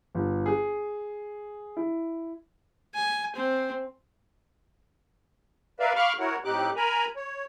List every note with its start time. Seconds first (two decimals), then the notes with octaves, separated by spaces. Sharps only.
0.15 G1
0.46 G#4
1.77 E4
2.94 G#5
3.35 C4
5.80 A#4 B4 D5 E5 F5
5.95 F5 B5 C#6 D6 F6
6.19 E4 F#4 A#4 C#5 F#5
6.44 A2 C4 D#4 G4 D6 F#6
6.76 A#4 G#5 A#5 B5
7.16 C#5